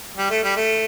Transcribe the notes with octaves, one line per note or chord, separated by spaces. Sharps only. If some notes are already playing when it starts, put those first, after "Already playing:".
G3
A3
G3
A3